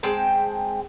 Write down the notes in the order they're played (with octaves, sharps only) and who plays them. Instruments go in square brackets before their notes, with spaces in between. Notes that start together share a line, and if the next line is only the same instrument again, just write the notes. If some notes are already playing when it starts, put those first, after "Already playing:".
[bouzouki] G#3 C4 G5 A5